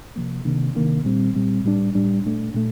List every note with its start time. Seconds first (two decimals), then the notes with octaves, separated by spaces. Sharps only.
0.16 C3 F3 A#3
0.45 C3 D#3 A#3 D4
0.75 C3 D#3 A#3 D4
1.05 A#2 G3 C4
1.35 A#2 G3 C4
1.64 A2 G3 D4
1.95 A2 G3 D4
2.24 A#2 A3 D4
2.54 A#2 A3